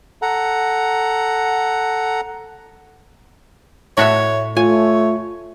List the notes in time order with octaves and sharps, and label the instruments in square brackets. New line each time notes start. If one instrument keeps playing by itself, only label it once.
[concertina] A4 F#5 A#5
[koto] A2 F#4 E5 [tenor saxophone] C#5
[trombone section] A3 [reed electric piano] F4 [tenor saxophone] C#5 [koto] G#5